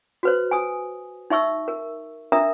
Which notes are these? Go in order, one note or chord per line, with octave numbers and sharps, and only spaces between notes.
F#4 B4 C5
G#5 D#6
D#4 E5 C#6 E6
A#4
D4 A#4 E5 A#5 D#6